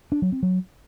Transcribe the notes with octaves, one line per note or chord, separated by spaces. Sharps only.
D4
F#3
C4
F#3